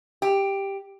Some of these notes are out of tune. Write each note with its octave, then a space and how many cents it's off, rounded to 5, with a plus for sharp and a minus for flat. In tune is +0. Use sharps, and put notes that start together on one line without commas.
G4 +5